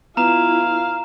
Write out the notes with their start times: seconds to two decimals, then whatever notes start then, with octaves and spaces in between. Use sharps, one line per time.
0.17 B3 E4 F4 F5 A#5 E7